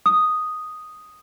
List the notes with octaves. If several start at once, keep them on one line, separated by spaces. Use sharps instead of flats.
D#6